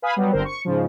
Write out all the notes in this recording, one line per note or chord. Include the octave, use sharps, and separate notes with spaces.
B4 F5 G#5 B5 D#6
F#3 G3 B3
G1 D3 C4 A#4 C5
C#6
G#2 C#3 F3